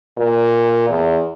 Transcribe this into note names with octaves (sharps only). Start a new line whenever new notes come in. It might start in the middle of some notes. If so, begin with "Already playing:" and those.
A#2
E2